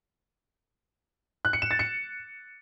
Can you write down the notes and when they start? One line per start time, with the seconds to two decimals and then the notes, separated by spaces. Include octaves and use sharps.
1.45 F#6
1.53 C#7
1.62 E7
1.71 A6
1.79 C#7